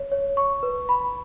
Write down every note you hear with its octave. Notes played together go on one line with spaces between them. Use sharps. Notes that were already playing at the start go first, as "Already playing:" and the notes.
Already playing: C#5
C#5
C#6
B4
B5